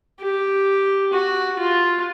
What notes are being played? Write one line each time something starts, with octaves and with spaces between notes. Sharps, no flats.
G4
F#4
F4